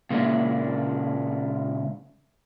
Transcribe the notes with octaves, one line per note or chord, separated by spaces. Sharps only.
A#2 C#3 G#3 A#3 D4 E4